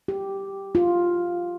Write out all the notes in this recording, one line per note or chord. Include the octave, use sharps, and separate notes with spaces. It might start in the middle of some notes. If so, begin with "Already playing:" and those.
G4
F4